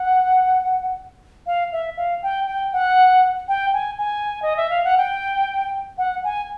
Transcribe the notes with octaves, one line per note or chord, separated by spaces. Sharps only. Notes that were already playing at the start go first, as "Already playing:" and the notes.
Already playing: F#5
F5
E5
F5
G5
G5
F#5
G5
G#5
G#5
D#5
E5
F5
F#5
G5
F#5
G#5